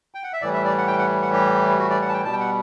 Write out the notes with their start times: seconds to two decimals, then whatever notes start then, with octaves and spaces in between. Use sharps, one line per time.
0.15 G5
0.24 F#5
0.33 E5
0.41 A2 E3 G3 D5
0.54 E5
0.65 D5
0.78 F#5
0.88 G5
0.98 F#5
1.22 F#5
1.33 G4
1.79 F#4
1.90 D5
2.02 F#5
2.09 A5
2.14 G5
2.25 B2 G3 A5
2.33 G5
2.40 F#5